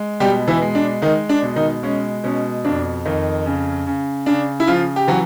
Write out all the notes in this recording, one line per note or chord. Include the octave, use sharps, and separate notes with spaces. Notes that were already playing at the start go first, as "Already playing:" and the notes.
Already playing: G#3
B2 G3 G4
E3 E4
G#3
D4
D#3 G#3 D#4
D4
B2
D#3 D#4
G#3 C#4
B2 C#4
F2 D4
F2 D#3 D#4
C#3
C#3
C#3 D4
E4
C#3 F3 F4
G4
E3 F#3 F#4